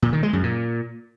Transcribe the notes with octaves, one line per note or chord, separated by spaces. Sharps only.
A#2
D#3
G#3
F#2
A#2